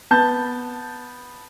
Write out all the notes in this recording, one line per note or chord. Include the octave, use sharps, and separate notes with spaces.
B3 A5 G6